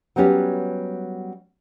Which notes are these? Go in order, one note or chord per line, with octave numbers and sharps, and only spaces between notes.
F#3 G3 B3 C#4 G4